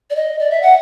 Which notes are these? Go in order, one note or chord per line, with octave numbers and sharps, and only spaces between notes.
D5
D#5
D5
E5
F#5